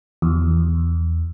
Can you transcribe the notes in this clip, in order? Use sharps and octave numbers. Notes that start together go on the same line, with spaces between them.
E2